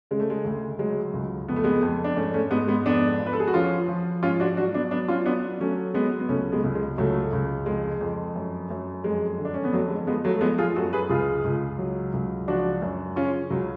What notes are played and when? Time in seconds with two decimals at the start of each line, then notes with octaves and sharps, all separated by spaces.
0.11 C#3 G#3
0.20 A3
0.30 G#3
0.45 D2
0.79 F#3 G#3
1.14 C#2
1.48 F2 B3
1.56 A3
1.64 G#3 B3
1.82 F2
2.04 D4
2.17 G#2 A3 C#4
2.34 A3 C#4
2.51 G#2 G#3 B3
2.68 G#3 B3
2.86 F2 B3 D4
3.20 F3
3.26 B4
3.33 A4
3.40 G#4
3.48 F#4
3.54 F3 C#4 F4
3.89 F3
4.23 G#2 C#4 F4
4.40 D4 F#4
4.57 F#3 D4 F#4
4.74 B3 D4
4.91 F#3 B3 D4
5.08 C#4 F4
5.26 F#3 B3 D4
5.60 F#3 A3 C#4
5.94 F#3 G#3 B3
6.20 B3
6.29 C#2 A3 C#4
6.52 G#3 B3
6.64 C#2
6.75 G#3
6.98 C#2 F#3 A3
7.33 C#2
7.66 F2 G#3
8.01 F2
8.35 F#2
8.70 F#2
9.04 F2 G#3
9.38 D3
9.45 D4
9.54 C#4
9.64 B3
9.73 F2 F#3 A3
9.90 G#3
10.07 F3 G#3 B3
10.24 F#3 A3
10.35 A3
10.41 F3 G#3 B3
10.58 F4 G#4
10.76 F#2 F#4 A4
10.93 G#4 B4
11.10 C#2 F4 G#4
11.45 C#2
11.78 F#3
12.14 C#2
12.48 F3 D4 F#4
12.82 F#2
13.16 C#3 C#4 F4
13.50 C#2 F#3